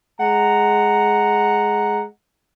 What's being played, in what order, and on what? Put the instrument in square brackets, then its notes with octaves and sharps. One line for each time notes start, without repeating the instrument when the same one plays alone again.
[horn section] G#3 F#5 A#5